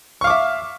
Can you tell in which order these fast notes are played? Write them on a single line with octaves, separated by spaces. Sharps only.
C#6 F5 D6 E5